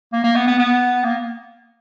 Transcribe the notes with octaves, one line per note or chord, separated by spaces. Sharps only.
A#3
A#3
B3
B3
B3
A#3